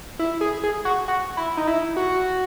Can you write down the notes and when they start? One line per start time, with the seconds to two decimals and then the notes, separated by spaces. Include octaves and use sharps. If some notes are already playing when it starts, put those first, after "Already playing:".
0.19 E4
0.41 G#4
0.64 G#4
0.85 F#4
1.08 F#4
1.37 E4
1.57 D#4
1.67 E4
1.97 F#4